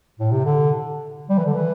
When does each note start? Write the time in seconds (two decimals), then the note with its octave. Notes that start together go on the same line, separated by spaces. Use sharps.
0.19 A2
0.31 C3
0.45 D3
1.30 G3
1.38 E3
1.46 D3
1.55 E3